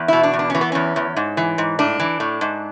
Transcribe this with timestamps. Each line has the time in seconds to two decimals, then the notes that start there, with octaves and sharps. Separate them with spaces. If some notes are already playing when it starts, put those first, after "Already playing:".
Already playing: E2
0.08 B2 E4
0.23 D4
0.33 E2
0.39 D4
0.50 E3 C#4
0.61 B3
0.72 E2 C#4
0.96 E2
1.16 G#2
1.37 E3
1.58 G#2
1.79 A2 D4
2.00 E3
2.20 A2
2.41 G#2